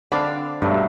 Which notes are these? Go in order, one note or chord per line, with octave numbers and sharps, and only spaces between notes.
D3 C4 D4 D5 F5 B5
G2 B2 F#3 G3 A3